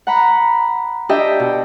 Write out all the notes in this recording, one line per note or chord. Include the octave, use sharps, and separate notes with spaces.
F#5 A#5 B5
D4 G4 D#5 E5 G5
B2